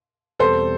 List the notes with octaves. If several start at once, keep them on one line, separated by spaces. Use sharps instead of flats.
E2 B2 G3 C4 A4 C5